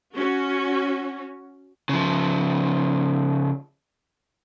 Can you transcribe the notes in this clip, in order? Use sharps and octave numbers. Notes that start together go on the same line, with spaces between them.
C#4 F#4
C#3 F3